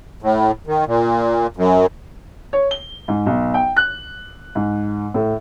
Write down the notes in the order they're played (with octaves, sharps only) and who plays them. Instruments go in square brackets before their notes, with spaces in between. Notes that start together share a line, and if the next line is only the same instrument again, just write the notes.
[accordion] A2
D#3
A#2
F#2
[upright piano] C#5
G7
G#2
B1
G5
F#6
G#2
A2